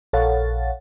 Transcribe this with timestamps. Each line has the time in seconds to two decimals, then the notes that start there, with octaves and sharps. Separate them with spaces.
0.13 A#1 A4 C#5 F5 F#5 A6